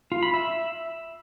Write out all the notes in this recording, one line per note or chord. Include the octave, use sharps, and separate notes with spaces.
F4
B5
E5